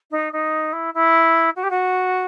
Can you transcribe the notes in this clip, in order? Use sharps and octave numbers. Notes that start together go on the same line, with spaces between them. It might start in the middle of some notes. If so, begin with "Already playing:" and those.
D#4
D#4
E4
E4
F#4
G4
F#4